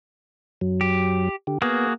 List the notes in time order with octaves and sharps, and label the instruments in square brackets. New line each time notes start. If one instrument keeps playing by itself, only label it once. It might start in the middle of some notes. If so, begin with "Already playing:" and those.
[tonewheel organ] F#2 F#3
[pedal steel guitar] G4
[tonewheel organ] D3 G4
[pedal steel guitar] A#3 F#4 G#4 [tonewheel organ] B3